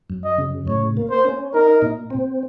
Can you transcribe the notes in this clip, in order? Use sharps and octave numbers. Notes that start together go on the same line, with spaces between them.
F#2
D#5
C#3
A2 C#5
A#3
C5
C#4
D#4 A#4
A#2
C4